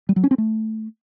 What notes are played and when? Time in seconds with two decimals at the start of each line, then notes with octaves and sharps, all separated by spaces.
0.09 G3
0.16 F#3
0.24 C#4
0.31 C4
0.38 A3